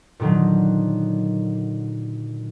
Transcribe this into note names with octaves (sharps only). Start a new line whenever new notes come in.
A#2 D3 D#3 F#3